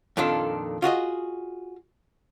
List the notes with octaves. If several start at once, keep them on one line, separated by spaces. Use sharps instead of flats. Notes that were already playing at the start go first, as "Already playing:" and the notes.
F2 A#2 D#3 D4 F4 A4
F4 F#4 G#4 D#5